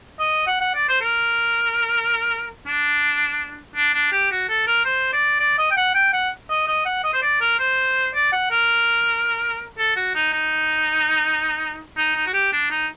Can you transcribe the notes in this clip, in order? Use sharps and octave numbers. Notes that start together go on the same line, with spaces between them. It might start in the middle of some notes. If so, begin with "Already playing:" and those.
D#5
F#5
F#5
D5
C5
A#4
D4
D4
D4
G4
F#4
A4
A#4
C5
D5
D5
D#5
G5
F#5
G5
F#5
D#5
D#5
F#5
D#5
C5
D5
A#4
C5
D5
F#5
A#4
A4
F#4
D#4
D#4
D#4
D#4
F#4
G4
D4
D#4